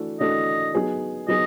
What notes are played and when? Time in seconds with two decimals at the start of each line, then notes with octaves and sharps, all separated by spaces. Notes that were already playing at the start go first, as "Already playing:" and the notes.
Already playing: E3 A3 D4 F#4 A4
0.20 E3 A3 D4 F#4 A4 D#5
0.74 F#3 B3 D#4 G#4
1.28 F#3 B3 D#4 G#4 D#5